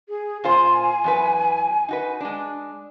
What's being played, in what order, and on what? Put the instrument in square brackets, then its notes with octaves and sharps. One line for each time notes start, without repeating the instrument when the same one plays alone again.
[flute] G#4
[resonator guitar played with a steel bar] A#2 F4 C5 [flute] G#5
[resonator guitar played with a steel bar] E2 F#3 B4
D#4 F#4 B4
G#3 D4